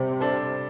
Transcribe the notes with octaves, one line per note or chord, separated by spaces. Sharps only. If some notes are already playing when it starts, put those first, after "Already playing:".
Already playing: C3 G3
D4 A4 C5